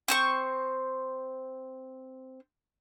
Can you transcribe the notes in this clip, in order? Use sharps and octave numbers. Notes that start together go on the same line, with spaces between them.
C4 C5 C#6